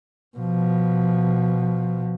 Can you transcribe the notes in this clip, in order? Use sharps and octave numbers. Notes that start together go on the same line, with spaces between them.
B2 F3